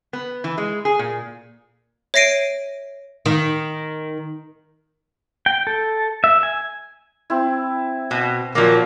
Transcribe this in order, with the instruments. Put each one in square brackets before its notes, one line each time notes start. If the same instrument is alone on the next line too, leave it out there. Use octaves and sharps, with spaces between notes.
[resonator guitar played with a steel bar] B3
E3
G#3
G#4
A#2
[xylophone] C#5 E5 A#6 C7 D7 D#7
[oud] D#3
[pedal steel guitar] G5
A4
E5
G#5
[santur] C4 E4
[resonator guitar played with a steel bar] B2
[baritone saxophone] A#2 [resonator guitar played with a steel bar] F3 F#3 A#3